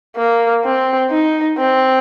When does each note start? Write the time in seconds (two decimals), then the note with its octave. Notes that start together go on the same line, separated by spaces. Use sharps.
0.17 A#3
0.64 C4
1.11 D#4
1.58 C4